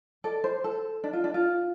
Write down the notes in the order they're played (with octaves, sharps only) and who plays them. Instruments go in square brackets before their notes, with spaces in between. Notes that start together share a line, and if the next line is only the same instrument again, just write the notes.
[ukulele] A4 D5
C5
A4
D4
F4
D4
F4